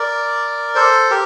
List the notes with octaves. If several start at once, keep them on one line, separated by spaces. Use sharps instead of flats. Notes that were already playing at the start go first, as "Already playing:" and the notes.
Already playing: A#4 D5
A4 C5
G4 A#4